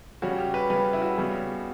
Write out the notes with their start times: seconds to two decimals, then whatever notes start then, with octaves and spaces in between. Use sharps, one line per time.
0.22 C#3 G3 C#4 F#4
0.39 G4
0.54 B4
0.70 C#3 G3 C#4 B4
0.93 E4
1.02 F#4
1.18 C#3 G3 B3